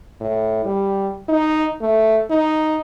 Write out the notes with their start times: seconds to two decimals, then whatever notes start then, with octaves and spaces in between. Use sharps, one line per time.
0.21 A2
0.65 G3
1.28 D#4
1.82 A3
2.30 D#4